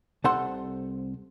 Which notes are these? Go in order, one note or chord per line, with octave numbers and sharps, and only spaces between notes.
C2 A4 C5 F#5 C6